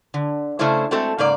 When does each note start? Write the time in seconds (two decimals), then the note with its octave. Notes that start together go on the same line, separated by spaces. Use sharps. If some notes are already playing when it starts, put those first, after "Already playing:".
0.14 D3
0.59 C#3 A3 C#4 D4 E4 C5
0.91 G#3 A3 C4 F#4 A4
1.18 G#2 C#3 A#3 D5